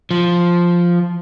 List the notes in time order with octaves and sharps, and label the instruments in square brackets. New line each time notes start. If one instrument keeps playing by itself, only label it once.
[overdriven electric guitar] F3